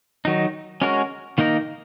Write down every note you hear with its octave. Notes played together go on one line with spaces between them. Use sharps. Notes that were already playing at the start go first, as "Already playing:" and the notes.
D#3 F#3 D#4
G#3 C#4 F#4 A#4 C#5
D#3 A#3 D#4 A#4